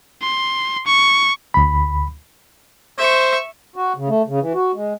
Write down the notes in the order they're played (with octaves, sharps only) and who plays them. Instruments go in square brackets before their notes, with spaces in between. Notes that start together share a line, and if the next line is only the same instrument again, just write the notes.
[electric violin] C6
C#6
[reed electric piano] D2 B5
[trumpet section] C5 [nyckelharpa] E5 C#6
[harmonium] F#4
C#3
A3
C#3
E3
F#4
G#3